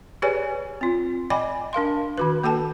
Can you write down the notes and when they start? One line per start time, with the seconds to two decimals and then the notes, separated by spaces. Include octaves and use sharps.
0.22 G4 G#4 B4 C#5 D5 G#5
0.81 C4 F4
1.30 D5 D#5 G5 G#5 B5 D6
1.73 D4 A#4 F5 C6
2.18 D#3 F#4 B4
2.43 A#3 F#4 A4 G5 A5